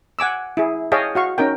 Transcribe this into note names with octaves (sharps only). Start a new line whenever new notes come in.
F#5 G#5 D6 E6
E4 G#4
G#4 C#5 D#5 F5 G5 A5
F#4 F5 C#6
C#4 D#4 A#4 G5